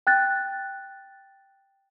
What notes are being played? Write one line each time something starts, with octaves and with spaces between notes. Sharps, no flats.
G5 F#6 A6